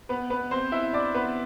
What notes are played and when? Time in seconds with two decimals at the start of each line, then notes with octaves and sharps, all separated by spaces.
0.09 B3 B4
0.30 B3 B4
0.51 C4 C5
0.72 E4 E5
0.93 D4 D5
1.14 B3 B4